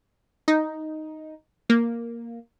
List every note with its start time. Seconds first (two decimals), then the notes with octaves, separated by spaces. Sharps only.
0.48 D#4
1.70 A#3